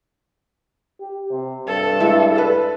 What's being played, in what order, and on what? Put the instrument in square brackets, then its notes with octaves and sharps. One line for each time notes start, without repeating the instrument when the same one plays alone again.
[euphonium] G4
C3
[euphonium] G2 [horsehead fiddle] A4
[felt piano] G#3 E4
A4 B4